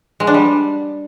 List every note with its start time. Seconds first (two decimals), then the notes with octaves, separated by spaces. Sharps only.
0.20 G#3
0.27 D4
0.34 G3